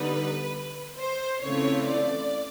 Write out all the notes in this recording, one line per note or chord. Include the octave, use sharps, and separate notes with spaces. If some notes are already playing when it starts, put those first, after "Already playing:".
Already playing: D3 G3 B3 D#4 B4
C5
C#3 E3 A3 C4 F4 C#5
D5